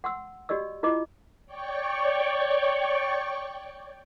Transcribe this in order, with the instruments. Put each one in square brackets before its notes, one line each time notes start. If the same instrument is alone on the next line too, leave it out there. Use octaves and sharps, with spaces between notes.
[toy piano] F#5 C6 E6
F#4 G4 D5 D#5 E6
E4 F4 D#5 D6
[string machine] C#5 D5 G5 C#6